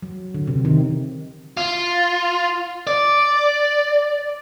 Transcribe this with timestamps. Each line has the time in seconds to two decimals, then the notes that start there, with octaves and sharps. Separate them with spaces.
0.02 F#3
0.34 D3
0.48 C3
0.65 D#3
1.57 F4
2.87 D5